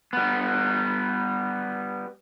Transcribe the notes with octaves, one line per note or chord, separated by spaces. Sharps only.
G3 B3